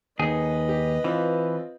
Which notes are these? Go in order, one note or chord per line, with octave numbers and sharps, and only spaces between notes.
D#2 D#4 G#4 B4 D#5
G4
E3 C4 F4